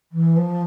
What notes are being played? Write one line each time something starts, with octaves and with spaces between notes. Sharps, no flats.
E3
F3